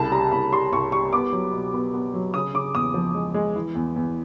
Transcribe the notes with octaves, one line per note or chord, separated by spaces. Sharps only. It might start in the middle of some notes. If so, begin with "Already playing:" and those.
Already playing: C2 C#3 A5
G3 A#5
C2 B5
G3 C6
C2 C#6
G3 C#6
B3 D6
F#3
B2
B3
B3
F#3
C#3 D#6
C#3 D6
E2 D#6
F3
G#3
G#3
E3
E2
E2